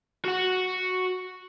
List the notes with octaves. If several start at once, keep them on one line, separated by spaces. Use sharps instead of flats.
F#4 F#5